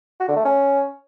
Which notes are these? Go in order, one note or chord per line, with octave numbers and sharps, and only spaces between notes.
F#4
D3
A3
C#4